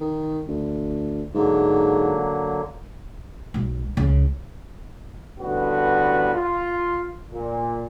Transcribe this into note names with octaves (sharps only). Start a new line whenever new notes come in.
D#3
D2
G#2 D3 F#3 A#3
B1 G#3
C#2 C#3
A1 D3 G3 B3 F#4
F4
A#2